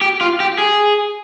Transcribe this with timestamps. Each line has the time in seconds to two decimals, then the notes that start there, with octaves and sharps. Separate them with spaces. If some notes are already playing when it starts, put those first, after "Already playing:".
0.01 G4
0.21 F4
0.40 G4
0.58 G#4